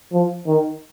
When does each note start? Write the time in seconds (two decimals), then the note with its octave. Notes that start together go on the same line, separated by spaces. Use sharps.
0.12 F3
0.47 D#3